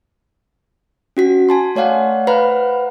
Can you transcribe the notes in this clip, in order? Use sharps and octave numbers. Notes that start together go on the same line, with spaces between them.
C#4 F#4 B6
G#5 A5 C6
A3 C#5 D5 F5 F#5
B4 C5 F5 F#5 A#5 B5